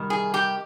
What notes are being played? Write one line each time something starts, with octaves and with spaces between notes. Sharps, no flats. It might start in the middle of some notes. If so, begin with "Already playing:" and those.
Already playing: C3 D#3 G3
G#4
G4